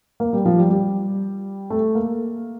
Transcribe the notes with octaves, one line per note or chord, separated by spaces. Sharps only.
A#3
G3
F3
G3
G3
A3
A#3